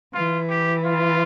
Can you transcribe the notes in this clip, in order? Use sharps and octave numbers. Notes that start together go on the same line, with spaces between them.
E3 F4
G4
F4